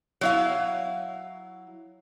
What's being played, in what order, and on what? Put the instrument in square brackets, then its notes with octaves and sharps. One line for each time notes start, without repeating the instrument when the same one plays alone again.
[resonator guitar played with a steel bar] F#3 E4 F5